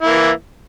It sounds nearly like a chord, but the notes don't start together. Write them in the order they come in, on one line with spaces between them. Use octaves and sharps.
E4 A#3 E3